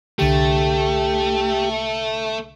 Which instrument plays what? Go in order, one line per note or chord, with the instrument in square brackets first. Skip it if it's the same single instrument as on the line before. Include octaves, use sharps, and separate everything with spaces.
[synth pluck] C2 D3 A6 [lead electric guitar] A3 [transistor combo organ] G4